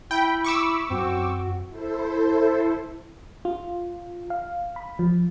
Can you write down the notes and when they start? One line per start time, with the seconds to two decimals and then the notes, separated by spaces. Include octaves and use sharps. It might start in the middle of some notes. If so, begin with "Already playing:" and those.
0.11 E4 G5 B5
0.44 C#6 D6 E6
0.90 F#2 C4 F#4
1.69 E4 A4 C5
3.45 F4
4.30 F5
4.76 B5
4.99 F3